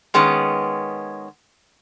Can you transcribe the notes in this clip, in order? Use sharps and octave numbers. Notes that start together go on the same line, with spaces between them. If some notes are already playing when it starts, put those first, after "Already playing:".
D#3 G#3 B3 C#4